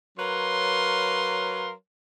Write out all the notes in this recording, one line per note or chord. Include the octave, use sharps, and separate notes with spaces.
F#3 A#4 B4 C#5 F5 C6